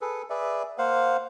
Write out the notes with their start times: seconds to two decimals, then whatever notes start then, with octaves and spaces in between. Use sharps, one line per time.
0.01 G#4 A4 B4
0.30 G#4 B4 D5 E5
0.78 A#3 C5 F5 F#5